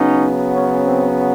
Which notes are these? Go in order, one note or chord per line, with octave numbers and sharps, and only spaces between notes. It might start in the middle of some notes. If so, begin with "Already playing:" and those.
Already playing: C#3 F#3 B3 C#4 D#4
C#4
C4